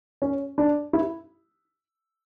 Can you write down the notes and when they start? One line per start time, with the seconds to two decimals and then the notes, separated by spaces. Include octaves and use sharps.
0.22 C#4
0.58 D4
0.93 E4